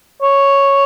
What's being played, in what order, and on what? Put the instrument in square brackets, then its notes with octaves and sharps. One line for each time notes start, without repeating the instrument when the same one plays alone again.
[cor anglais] C#5